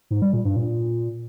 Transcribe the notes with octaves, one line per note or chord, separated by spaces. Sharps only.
G#2
G3
A#2
G2
A#2